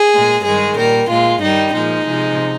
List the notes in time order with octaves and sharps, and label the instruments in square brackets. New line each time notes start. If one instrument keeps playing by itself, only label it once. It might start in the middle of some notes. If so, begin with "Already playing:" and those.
Already playing: [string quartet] G#4
A#2 G#3
G2 D#3 G#3 G#4
A#2 G3 A#4
A#2 G#3 F4
G2 D#3 G3 D#4
A#2 F3 G#3 D#4
C3 F3 G#3